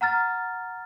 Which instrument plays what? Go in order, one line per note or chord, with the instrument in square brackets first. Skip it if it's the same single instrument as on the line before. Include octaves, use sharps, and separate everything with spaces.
[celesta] F#5 A#5 F6 A6